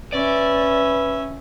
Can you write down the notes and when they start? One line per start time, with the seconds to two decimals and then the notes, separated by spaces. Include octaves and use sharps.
0.13 C#4 B4 D5 E5